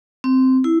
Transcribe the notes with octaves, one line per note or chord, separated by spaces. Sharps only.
C4
E4